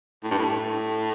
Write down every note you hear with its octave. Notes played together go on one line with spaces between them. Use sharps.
A2
G2
A2